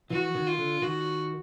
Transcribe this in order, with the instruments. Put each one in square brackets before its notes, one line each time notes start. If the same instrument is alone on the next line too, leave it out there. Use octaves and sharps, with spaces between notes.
[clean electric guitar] E3 [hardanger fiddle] F#4
[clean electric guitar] D#3
[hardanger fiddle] F4
[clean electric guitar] D3
[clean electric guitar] D#3 [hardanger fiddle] F#4